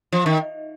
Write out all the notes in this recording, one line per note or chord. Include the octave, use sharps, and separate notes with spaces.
F3
D#3